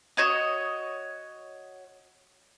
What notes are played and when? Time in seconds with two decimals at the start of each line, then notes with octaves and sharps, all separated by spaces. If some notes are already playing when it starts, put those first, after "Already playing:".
0.17 F#4 C#5 D#5